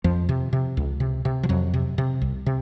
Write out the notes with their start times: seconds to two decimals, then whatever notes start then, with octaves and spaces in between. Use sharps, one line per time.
0.04 F2 F3
0.29 C3
0.53 C3
0.77 C#2
1.00 C3
1.25 C3
1.43 F3
1.49 F2 F#3
1.74 C3
1.98 C3
2.21 C2
2.46 C3